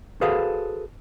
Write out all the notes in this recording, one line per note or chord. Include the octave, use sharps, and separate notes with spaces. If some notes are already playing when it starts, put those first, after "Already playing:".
F#4 G#4 A4 B4 C5 F5